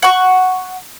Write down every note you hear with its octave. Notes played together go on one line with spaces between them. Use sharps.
F#5 C#6